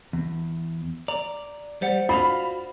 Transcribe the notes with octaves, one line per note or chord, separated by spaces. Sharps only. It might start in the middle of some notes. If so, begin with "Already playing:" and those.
E2
D5 A#5
G3 C5 D5 F#5
F4 F#4 F5 B5